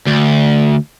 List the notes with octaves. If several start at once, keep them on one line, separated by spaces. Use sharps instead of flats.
D2